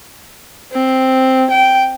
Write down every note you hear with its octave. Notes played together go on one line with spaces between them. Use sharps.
C4
G5